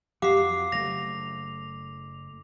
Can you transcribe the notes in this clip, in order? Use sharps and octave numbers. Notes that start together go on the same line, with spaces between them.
F2 F#3 G4 F5 F#5 D6 C7
F#1 A3 A#6 F7